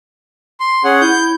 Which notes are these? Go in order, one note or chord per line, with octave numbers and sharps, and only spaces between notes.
C6
C#4 G#4 F#5
E4 G6